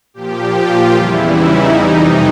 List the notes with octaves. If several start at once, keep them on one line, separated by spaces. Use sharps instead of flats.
A#2 F3 G4
F4
E2 C#3 E3 G3 E4
D#4
F2 C3 E3 G3